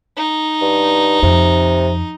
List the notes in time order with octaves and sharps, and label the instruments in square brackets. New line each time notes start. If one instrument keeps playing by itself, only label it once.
[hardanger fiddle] D#4
[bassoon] G2
[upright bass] F2 [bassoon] C3